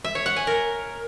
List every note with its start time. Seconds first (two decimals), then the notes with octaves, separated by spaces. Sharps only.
0.04 E5
0.15 C#5
0.26 F#5
0.36 G#5
0.47 A#4